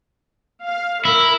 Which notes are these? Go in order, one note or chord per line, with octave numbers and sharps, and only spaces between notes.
F5
E4 A#4